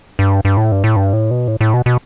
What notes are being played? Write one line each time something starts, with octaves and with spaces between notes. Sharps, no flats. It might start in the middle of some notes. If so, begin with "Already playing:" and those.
G2
G2
A2
G2
A2
G2
A2
B2
A2
A2
B2
B2